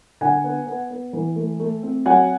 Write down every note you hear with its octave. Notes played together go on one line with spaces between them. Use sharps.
D3 F#5 G#5
B3
B3
B3
E3
A3
A3
C4
F#3 F#5 G#5